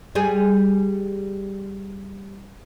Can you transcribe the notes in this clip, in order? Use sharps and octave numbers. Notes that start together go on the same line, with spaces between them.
G3 G#4